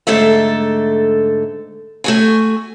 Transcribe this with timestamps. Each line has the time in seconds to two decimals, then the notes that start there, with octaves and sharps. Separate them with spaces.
0.07 G#2 D3 A3 A4 E5
2.04 A3 F#4 G#5